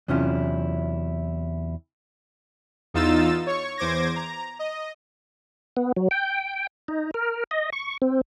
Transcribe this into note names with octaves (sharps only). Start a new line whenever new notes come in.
E2 C3 F#3 C#4 E4 F4
E2 D#4 F4 E6 A6 E7
C#5 C#6
E2 C5 D6 G#6 A#6
A#5
D#5
B3
F#3
G5
D#4
A#4
D#5
C#6
C4